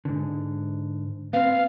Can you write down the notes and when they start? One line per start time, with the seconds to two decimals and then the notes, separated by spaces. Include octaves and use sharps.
0.05 G#2 D3
1.33 B3 C4 F5